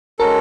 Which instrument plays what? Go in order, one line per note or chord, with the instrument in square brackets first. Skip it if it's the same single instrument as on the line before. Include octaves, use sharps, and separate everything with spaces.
[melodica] G#3 C#4 F#4 A4 [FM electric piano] A#4